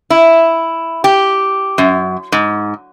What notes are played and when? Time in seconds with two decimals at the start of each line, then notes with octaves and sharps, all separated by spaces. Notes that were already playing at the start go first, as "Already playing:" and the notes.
0.10 E4
1.04 G4
1.78 F#2
2.32 G#2